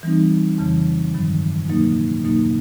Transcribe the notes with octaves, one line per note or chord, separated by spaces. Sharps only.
E3 G3 C4 D#4
F2 C#3 E3
G2 D#3 F#3
B2 F#3 A#3 D#4
E2 B2 F#3 A#3 D#4